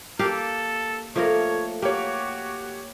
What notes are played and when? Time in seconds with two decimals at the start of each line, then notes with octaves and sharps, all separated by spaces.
0.19 A#3 G4 A4 F5
1.16 F3 A3 A#3 A#4 C#5
1.82 A#3 F#4 G4 C#5